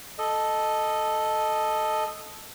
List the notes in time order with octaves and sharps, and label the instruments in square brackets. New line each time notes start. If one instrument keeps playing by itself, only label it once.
[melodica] A4 D#5